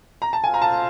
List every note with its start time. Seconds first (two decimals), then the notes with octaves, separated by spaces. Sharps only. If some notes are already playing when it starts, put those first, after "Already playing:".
0.22 A#5
0.33 A5
0.43 F4 A4 C5 F5 G#5
0.54 A#5
0.62 A5